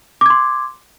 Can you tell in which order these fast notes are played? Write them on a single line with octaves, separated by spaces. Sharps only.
D6 G#6 C6